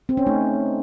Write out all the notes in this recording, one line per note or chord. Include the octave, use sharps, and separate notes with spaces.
C4
C#4
A3 D#4